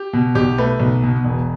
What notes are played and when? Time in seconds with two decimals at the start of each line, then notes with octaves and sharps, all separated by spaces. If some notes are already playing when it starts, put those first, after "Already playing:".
Already playing: G4
0.13 B2
0.35 B1 G4
0.58 A3 B4
0.80 B1
1.03 B2
1.25 E1